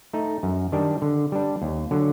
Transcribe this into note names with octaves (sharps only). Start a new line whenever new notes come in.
A3 D#4
F#2
D#3 G3 D4
D3
G3 D4
D#2
D3 F#3